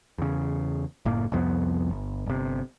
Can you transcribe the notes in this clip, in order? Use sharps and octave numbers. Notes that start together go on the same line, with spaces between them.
E2 C#3
F#1 A2 A#3
C2 F2 F3 B3
G1
G1 C3